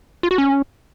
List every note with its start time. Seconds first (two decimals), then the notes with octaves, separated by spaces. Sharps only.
0.23 F4
0.31 F#4
0.38 C#4